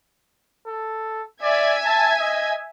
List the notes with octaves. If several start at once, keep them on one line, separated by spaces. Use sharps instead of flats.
A4
D5 E5 G#5 G#6
A5
D#5